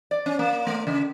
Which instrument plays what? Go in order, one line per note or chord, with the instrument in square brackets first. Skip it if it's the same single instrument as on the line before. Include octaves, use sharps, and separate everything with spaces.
[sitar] D5
C#4
A#3
A3
C#3